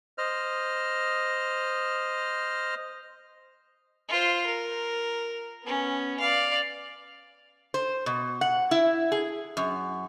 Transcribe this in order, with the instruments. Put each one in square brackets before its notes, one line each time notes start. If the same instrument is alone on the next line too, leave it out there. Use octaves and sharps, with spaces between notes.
[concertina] C5 D#5 F6
[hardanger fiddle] F4 C5
A#4
B3 C#4
D5 F5
[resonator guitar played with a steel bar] C5
B2
F#5
E4
G#4
F#2